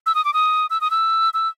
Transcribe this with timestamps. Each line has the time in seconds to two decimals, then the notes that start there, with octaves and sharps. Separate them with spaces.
0.06 E6
0.15 D#6
0.25 D6
0.34 D#6
0.70 E6
0.81 D#6
0.91 E6
1.34 E6